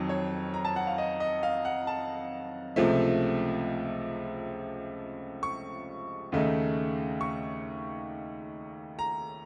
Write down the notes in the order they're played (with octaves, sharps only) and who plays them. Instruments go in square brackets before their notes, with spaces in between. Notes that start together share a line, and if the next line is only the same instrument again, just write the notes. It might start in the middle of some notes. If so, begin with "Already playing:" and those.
Already playing: [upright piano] F2 D#3 F#3
C#5
A#5
A5
F#5
F5
D#5
D#5
F5
F#5
A5
C#2 C3 F3 A3
C#6
D#2 C#3 A3 D#4
C#6
A#5